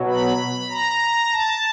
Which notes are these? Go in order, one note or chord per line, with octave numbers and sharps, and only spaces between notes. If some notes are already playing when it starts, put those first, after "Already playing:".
Already playing: B2 F#3
B5
A#5
A5